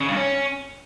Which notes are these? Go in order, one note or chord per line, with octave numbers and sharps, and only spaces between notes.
C#3
G2
C#4